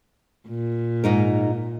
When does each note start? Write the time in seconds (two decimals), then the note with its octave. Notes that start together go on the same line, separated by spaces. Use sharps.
0.48 A#2
1.04 G#2 D#4 A#4